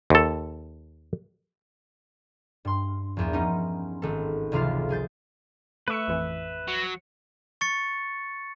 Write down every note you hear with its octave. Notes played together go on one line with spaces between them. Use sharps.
D#2 A4
G2 C6
A#1 E2
B3 C#4 D#4
G#1 A4
F1 C#2 E3 F4 F5
E3 G#4 G6 A6
A3 B4 E5 C#6 C#7
A1 F2 E3
F#3
C#6 A6 C#7